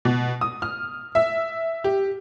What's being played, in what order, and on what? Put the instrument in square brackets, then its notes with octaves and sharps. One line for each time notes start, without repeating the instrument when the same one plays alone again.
[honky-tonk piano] B2
D#6
F6
E5
G4